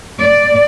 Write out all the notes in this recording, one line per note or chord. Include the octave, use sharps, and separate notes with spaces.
D5